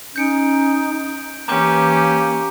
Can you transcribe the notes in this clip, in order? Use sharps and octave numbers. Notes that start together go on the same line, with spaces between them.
C#4 D#4 G6 C#7 D7
E3 A#3 C#4 G4 A#5 D6 G6